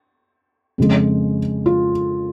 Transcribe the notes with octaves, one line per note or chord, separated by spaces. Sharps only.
F2 C#3 G#3
F4